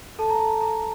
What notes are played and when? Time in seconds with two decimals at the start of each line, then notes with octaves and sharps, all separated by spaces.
0.19 A4 A5
0.30 A#5
0.39 A4 A5
0.61 A4 A#5